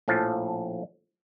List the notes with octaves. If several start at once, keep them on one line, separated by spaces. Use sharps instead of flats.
A#1 A2 F3 F5 A5